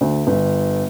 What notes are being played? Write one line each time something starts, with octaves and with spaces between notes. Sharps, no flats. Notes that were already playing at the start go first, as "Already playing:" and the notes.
D2
G1